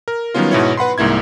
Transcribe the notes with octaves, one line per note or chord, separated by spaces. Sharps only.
A#4
D#3 F#3 G3 B3 C#4 F4
G#2 B2 E4 C#5
B4 F#5 B5 C6
C2 G#2 A#3 E4 G#6